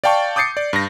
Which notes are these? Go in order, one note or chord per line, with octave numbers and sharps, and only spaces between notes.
D5 F5 G5 A5 C#6
D6 D#6 G6 A6 C7 C#7
D5
G2 A#6